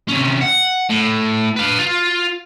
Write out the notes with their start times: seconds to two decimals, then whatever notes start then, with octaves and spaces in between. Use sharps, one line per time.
0.08 C3 C#4
0.41 F#5
0.89 A2
1.56 B4 F5
1.79 F4